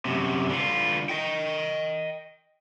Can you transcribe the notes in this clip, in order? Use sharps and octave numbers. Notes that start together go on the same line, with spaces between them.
F#2 C3
D3 F4
D#5 G5